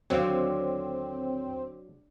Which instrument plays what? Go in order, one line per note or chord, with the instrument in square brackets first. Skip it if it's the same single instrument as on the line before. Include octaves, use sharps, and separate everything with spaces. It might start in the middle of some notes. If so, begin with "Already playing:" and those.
[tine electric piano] D#2 C#5 [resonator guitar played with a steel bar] D3 [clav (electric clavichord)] F#3 F5 [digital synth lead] C4